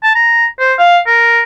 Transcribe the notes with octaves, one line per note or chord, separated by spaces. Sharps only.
A5
A#5
C5
F5
A#4